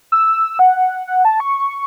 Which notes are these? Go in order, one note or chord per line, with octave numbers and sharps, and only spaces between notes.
E6
F#5
F#5
A5
C#6